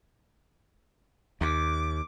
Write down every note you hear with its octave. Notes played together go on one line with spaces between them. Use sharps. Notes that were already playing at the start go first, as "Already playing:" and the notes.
D#2 D6